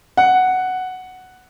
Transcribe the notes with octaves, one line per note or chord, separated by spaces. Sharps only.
F#5